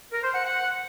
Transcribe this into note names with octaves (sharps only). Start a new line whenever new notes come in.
A#4
C5
F#5
F#5